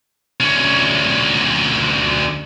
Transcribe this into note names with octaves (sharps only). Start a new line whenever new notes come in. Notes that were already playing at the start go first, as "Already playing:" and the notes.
D2 C#4